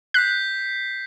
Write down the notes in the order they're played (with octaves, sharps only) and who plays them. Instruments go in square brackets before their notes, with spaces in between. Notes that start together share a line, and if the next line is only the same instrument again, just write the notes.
[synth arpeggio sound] F#6 [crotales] G6 B6 C7